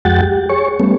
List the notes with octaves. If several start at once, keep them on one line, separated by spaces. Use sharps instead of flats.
F2 G#3 F#4 F#5 G5 A6
G4
G#4 C#5 C#6
G3 A3 B3 C#4